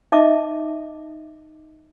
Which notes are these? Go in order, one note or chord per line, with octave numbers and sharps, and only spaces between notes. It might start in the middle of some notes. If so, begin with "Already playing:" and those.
D#4 D#5 E5 A5 D6